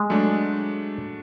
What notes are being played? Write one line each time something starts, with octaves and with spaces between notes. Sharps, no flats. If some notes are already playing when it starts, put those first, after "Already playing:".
Already playing: G#3
F#3 A3 D4